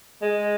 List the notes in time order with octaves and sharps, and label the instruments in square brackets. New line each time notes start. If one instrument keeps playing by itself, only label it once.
[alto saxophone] G#3